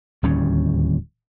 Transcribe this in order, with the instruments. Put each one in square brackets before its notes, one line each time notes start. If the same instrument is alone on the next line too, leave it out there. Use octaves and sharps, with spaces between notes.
[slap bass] D1 D#2 G3 C#4